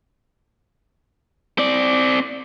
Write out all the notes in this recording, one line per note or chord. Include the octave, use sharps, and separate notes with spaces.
C4 D5